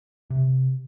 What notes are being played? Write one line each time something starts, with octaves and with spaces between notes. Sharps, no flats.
C3